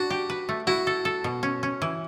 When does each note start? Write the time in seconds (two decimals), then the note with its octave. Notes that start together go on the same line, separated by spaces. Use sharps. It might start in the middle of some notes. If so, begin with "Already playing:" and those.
Already playing: D4 F#4
0.10 G4
0.30 B4
0.49 A3
0.67 E4 F#4
0.87 A4
1.05 A4
1.24 B2
1.43 C#4
1.63 C#4
1.82 E3